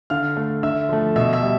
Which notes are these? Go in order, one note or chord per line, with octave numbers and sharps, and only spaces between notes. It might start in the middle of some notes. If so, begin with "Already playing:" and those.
D3 F5 F6
A3
D3 E5 E6
F3 A3
B2 E5 E6
E5 E6
G3